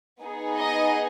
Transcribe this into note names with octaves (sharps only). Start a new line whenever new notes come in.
B3 D#4 G#4
D#5